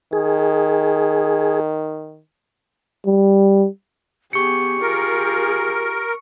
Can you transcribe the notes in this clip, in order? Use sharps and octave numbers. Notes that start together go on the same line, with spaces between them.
D#3 G#4
G3
B3 G4 G#4 C#6 C#7
F4 G#4 A#4